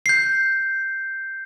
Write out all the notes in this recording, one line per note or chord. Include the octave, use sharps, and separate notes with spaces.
G6 C7